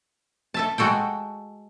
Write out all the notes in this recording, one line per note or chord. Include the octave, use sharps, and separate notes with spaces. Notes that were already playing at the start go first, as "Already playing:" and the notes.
A4 E5 A5
G#3 F#4 A4 G5